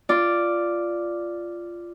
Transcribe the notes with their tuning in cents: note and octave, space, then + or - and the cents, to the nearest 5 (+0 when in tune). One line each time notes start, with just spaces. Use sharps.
F4 -10 D5 +0